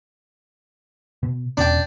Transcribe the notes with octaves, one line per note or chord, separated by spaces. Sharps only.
B2
E1 B2 C#4 D4 G5